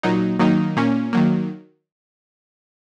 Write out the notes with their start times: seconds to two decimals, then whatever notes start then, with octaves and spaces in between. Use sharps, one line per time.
0.03 A#2 F#3 D#4
0.39 D#3 F#3 A#3 D#4
0.77 A#2 A#3 C#4
1.13 D#3 F#3 A#3